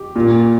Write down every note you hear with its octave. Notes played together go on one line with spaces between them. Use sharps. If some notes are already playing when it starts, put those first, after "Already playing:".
Already playing: G4
A#2